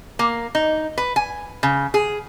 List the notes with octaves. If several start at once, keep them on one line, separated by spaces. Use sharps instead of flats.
A#3
D#4
B4
G#5
C#3
G#4